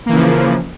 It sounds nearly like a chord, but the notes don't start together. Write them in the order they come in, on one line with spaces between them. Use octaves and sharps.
A#3 E3 C#3 F3